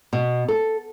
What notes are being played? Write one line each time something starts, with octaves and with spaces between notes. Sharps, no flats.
B2
A4